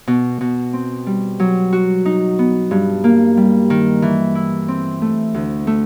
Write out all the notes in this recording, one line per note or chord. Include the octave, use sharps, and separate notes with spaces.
B2
B2
C4
G3
F#3
F#4
D#4
B3
G2
A#3
G3
D#3
E3
E4
C4
A3
D2
A3